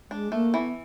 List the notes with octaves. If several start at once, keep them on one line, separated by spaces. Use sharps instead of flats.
G#3 D4
A3 A#3
E3 B3